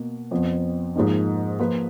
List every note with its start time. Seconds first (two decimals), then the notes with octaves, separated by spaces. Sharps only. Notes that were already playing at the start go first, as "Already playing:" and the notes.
Already playing: B2 A#3
0.31 F2 F3 B3
0.95 G#2 F3 A#3 D#4
1.59 F3 A#3 F4 B4